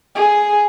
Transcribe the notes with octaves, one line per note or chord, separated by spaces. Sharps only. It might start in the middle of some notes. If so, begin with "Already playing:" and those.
G#4